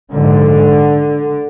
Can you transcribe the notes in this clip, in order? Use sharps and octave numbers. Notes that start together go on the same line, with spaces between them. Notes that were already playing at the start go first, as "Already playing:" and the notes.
A#1 G#2 D3